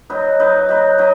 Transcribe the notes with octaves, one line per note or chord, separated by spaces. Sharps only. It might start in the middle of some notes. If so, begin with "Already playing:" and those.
F#3 D#4 B4
F#3 D#4 B4
F#3 D#4 B4
F#3 D#4